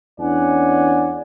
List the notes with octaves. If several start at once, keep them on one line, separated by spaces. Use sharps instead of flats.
E2 C#4 D4 D5 F#5 G#5